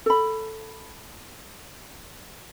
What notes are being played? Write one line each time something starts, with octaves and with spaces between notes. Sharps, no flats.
A4 B5